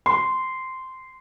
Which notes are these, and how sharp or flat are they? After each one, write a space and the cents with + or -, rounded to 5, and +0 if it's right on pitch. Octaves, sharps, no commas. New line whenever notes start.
C6 -10